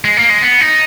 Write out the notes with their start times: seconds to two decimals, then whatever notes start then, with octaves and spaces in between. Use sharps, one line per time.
0.05 G#3
0.17 A#3
0.30 G#3
0.42 B3
0.61 D#4